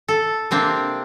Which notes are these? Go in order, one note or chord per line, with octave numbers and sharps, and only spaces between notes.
A4
C3 A#3 C4 D4